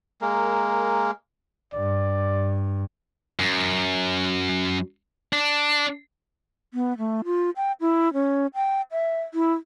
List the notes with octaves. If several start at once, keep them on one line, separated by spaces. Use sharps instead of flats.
G#3 A#3 A#4
G2 D5
F#2
D4
B3
A3
F4
G5
E4
C#4
G5
E5
E4